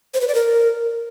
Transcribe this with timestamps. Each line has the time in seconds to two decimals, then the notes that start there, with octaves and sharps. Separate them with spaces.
0.14 C5
0.21 B4
0.28 D5
0.35 A#4